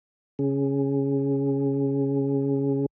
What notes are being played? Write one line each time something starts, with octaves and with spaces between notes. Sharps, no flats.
C#3 C#4 G#4